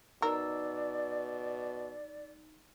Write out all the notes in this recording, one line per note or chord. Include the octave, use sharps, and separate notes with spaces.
B2 D#4 A#4 D5 E6